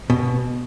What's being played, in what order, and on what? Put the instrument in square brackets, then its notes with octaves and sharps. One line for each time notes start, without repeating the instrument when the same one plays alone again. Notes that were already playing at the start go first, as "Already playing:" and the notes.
[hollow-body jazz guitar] B2